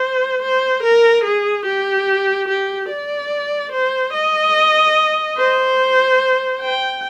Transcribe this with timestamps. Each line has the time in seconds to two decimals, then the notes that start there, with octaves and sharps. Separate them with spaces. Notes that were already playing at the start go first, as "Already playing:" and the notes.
Already playing: C5
0.42 C5
0.83 A#4
1.24 G#4
1.66 G4
2.49 G4
2.89 D5
3.72 C5
4.13 D#5
5.38 C5
6.61 G5